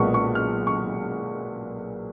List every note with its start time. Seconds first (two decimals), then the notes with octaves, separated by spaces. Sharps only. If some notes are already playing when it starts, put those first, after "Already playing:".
Already playing: B1 A#2 G#3 B3 C#6
0.14 C#6
0.35 F6
0.67 C#6